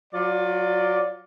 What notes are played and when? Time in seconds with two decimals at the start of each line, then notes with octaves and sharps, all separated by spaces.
0.13 F#3 F4 D5